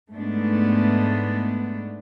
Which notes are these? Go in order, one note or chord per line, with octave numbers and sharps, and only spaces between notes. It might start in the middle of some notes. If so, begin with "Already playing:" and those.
G#2 A3 B3 D4